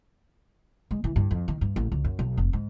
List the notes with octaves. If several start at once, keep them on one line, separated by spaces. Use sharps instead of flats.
G#3
E3
G2
F2
D#3
G2
A1
C#2
F#2
B1
F1
G#2